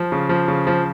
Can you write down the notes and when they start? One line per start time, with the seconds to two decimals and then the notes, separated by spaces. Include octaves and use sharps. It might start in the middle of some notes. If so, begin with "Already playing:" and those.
Already playing: F3
0.12 C#3
0.29 F3
0.48 C#3
0.67 F3